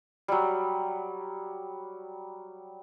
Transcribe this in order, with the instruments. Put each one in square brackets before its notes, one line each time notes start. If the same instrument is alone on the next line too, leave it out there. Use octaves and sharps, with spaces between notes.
[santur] F#3 G3